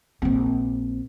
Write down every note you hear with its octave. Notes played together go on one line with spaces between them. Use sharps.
A#1 C4